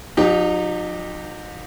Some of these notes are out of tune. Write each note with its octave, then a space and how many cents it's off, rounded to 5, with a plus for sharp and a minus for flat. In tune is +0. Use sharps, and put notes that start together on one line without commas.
F3 +45 D#4 -25 G4 +0